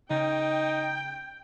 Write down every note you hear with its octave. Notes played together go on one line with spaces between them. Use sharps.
C#3 D#4 G5